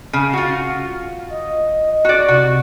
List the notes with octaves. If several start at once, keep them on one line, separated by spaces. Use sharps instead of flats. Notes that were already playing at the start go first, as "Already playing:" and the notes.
C#3
F4 F#4
D#5
F#4 D5
C3 F#4